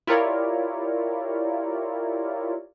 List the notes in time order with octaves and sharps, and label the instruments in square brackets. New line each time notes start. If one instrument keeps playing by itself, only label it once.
[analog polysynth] E4 F4 G4 A#4 C#5 D5